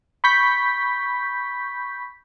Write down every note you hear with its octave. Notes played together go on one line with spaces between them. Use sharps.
B5 C#6 G6 B6